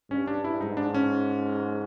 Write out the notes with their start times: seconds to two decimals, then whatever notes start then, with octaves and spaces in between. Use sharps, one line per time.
0.10 G2 C#4
0.27 D4
0.44 E4
0.61 G#2 D#4
0.77 D4
0.94 C#4